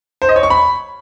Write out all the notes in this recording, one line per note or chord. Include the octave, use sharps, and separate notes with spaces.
C5
D#5
C#5
C#6
B5